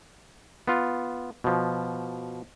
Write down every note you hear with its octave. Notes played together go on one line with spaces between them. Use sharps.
B3 F4
B2 F3